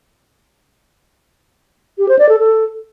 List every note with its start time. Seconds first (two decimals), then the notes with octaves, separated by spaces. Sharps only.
1.98 G4
2.09 C5
2.19 D5
2.29 A4
2.39 A4